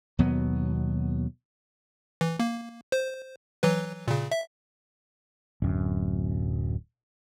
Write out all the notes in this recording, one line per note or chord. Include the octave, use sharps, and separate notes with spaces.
D#2 B2 F#3 B3
E3
A#3
C5
E3 F#3 B4
A#2 C#3
E5
D1 F#2